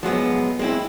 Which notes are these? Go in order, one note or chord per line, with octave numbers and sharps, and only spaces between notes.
F3 F#3 G#3 B3
G#3 C4 E4